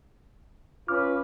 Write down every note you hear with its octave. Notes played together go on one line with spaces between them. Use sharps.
C#4 F4 B4 D6 F6